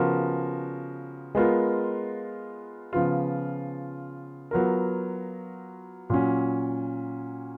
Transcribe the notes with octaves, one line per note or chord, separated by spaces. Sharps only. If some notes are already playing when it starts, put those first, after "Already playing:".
Already playing: C#3 F3 B3 F#4 A#4
G#3 B3 F4 A#4
C#3 F3 B3 F4
F#3 B3 F4 A#4
A#2 F#3 C#4